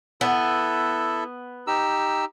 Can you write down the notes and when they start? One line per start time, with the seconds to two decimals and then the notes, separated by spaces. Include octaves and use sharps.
0.21 B3 E4 A4
1.67 D#4 G4 E6